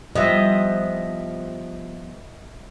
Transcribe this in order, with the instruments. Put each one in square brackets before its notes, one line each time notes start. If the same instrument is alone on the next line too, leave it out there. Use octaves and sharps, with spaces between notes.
[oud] F3 G3 B3 [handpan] D#5 E5